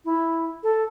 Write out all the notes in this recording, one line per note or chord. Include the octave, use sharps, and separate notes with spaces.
E4
A4